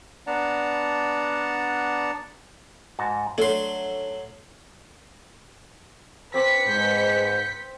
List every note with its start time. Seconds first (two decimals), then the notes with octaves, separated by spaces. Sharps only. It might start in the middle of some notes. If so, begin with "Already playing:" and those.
0.27 B3 D4 D5 F#5 A5 A#5
2.99 G#2 F#4 A5
3.38 F#3 A3 D4 C6
6.34 C4 B4 D6 B6 C#7
6.66 G#2 G6